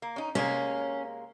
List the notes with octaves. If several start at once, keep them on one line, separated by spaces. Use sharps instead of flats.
A#3
C#4 D#4
C3 G#3 A#3 C#4